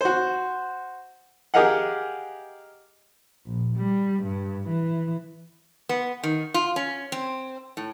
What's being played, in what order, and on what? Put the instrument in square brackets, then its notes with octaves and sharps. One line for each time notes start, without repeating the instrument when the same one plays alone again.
[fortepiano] F#4 C5
G4 G#4 A#4 D#5 F5 F#5
[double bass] A#1
G3
G2
E3
[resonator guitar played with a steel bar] B3
D#3
F4
C#4
C4
A2